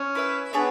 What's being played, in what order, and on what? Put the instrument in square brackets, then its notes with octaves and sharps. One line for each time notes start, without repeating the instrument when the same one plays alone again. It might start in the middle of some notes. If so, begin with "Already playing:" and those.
Already playing: [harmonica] C#4
[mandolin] E4 B4 E5
[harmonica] B3 [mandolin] D4 G#4 C#5 E5